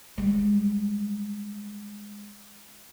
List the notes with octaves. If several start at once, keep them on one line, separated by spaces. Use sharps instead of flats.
G3 G#3